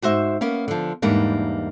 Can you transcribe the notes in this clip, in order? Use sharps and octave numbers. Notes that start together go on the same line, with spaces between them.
G#2 F#4 C5 E5
A#3 B3 C#4
D3 F3
E2 G#2 G3 A#3 D4